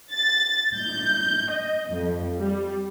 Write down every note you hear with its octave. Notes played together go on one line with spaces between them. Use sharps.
A6
G6
D#5
F2
G3